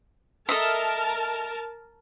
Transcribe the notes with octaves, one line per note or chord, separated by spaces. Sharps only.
A4 A#4 D#5 E5 A5